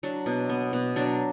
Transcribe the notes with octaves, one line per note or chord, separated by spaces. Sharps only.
F#3 D4
B2
B3
B2
F#3 D4